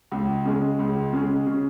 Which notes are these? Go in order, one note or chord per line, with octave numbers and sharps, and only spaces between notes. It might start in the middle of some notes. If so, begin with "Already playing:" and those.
C#2
C#3 G#3
C#2
C#3 G#3
C#3